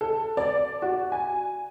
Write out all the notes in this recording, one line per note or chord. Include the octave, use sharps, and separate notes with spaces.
A4
D5
F#4
G#5